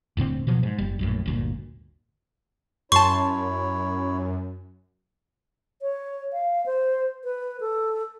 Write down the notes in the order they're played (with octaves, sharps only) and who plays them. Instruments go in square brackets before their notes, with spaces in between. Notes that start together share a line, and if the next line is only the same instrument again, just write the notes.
[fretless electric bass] D#1 A2 D3 C4
B2 F3 F#3
G#2
F#1 G3
A#1 F#2 A2
G1 D2 A#2
[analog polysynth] F#2 [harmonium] E4 C#5 [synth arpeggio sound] A5 C6 [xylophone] C#6
[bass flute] C#5
F5
C5
B4
A4